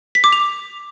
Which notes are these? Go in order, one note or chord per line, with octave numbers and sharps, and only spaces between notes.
B6
D6
F7